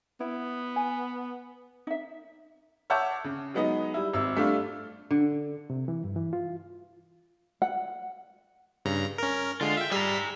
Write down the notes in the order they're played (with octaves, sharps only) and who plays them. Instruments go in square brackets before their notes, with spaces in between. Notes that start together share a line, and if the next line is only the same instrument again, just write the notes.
[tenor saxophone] B3 [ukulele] E4
[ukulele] G#5
D#4 E5
[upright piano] C#5 E5 F#5 A5 D6 G6
C#3
F#3 G#3 B3 D#4 D#5
G3 E4
G#1 E5 E6
G3 A3 D4 F4
[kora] D3
[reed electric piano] C3
E3
G2
E3
F4
[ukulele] F#5
[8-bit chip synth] G2 C#3 A#5
C#4 A#4
[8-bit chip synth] D3 G#3 [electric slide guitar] F4
[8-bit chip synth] E5 G5
[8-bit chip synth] G3 E6 B6 [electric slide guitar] G#4 A#5